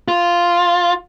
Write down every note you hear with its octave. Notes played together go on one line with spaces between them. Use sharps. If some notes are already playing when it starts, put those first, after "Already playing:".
F4